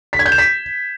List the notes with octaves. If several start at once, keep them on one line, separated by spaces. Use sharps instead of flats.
B6
G#6
G6
E7
B6